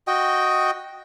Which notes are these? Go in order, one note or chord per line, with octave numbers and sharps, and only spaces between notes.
F#4 D#5 G5